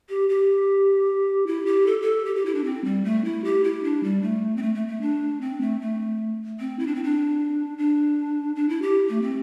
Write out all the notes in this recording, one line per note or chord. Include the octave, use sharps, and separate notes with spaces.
G4
G4
E4
G4
A4
A4
G4
G4
E4
D4
C4
G3
A3
E4
G4
E4
D4
G3
A3
C4
A3
A3
A3
D4
C4
A3
A3
C4
E4
D4
C4
D4
D4
D4
E4
G4
A3
C4